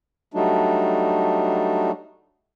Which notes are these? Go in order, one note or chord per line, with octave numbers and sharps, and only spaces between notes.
F#3 G3 A3 D4 D#4